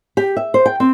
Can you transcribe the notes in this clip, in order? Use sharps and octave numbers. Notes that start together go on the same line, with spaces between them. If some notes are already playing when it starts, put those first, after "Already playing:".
G4
E5
C5
G5
C4